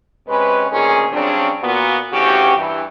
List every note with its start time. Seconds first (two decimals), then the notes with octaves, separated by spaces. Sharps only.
0.27 C3 G#3 C#4 B4
0.71 D2 A#2 D#3 C#4 G#4
1.12 C#3 F#3 G3 C4 D4
1.62 A#2 B3 F#4
2.12 D2 C#3 E3 F#4 G4
2.57 G2 E3